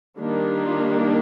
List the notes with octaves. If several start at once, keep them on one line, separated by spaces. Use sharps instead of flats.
D#3 G3 A#3 D4
F4